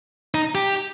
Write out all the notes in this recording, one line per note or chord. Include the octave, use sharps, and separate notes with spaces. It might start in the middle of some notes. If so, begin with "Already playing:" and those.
D#4
G4